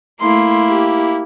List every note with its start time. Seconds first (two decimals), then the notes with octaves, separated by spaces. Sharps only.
0.21 A3 A#3 E4 C6
0.70 G4